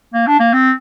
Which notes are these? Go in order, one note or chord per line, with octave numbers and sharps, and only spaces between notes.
A#3
D4
A#3
C4